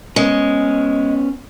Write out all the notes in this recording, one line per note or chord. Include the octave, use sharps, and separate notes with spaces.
G#3 B3 C#4